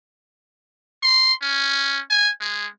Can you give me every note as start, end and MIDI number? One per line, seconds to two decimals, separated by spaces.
1.03 1.33 84
1.42 2.01 61
2.10 2.30 80
2.40 2.67 56